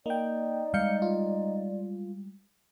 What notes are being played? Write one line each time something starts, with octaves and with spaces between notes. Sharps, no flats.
A#3 D#4 D5 G5
G3 G#3 F5 G6 C#7
F4